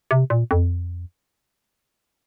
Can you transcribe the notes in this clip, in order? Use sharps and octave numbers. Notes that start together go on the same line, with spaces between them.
C3
A#2
F2